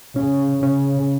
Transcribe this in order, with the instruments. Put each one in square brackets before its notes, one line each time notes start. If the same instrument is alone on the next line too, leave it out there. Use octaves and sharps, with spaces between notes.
[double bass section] C#3 [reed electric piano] C#4
[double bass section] C#3 [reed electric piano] C#4